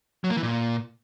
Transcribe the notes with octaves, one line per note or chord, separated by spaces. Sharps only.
F#3
A#3
E3
A#2